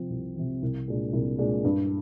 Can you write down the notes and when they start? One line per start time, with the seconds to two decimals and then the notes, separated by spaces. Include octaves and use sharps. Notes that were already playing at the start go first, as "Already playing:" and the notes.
Already playing: C3 F3 C4
0.10 C2
0.36 C3 F3 C4
0.62 C2
0.88 A#2 G#3 D4
1.13 C2
1.39 A#2 G#3 D4
1.64 G2